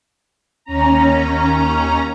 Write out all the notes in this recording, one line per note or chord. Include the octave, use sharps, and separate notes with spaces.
D#2 C#4 A#5